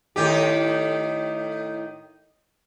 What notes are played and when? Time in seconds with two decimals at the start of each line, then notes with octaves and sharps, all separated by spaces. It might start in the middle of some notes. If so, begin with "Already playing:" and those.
0.16 A2 D#3 G4